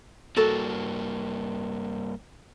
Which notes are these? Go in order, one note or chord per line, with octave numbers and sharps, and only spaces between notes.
G2 A#3 F#4 A4